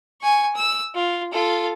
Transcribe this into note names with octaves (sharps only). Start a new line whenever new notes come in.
G#5 C#6
E6
F4
F4 A4